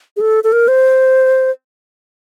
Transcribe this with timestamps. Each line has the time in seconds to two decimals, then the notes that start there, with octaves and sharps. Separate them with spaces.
0.17 G#4
0.21 A4
0.44 A4
0.52 A#4
0.68 C5